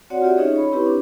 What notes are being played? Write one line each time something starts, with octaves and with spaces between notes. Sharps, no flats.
C4 F#4 C#5 D5 F#5
F4 G4 D5 E5
C#4 D#4 G#4 C#5 D#5
C#5 B5 C#6
C4 E4 G4 B4
D4